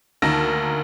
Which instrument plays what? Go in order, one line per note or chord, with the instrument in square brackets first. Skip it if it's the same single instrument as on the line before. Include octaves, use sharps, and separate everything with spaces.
[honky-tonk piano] D2 D#3 A#3 A#4 A5 A#6